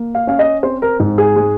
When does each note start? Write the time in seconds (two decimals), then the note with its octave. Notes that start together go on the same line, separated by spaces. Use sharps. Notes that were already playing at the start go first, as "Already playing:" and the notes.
Already playing: A#3
0.15 F5
0.27 C#4 F5
0.39 D#5
0.63 C4 C5
0.82 A#4
1.00 G#2
1.18 G#4
1.36 G#3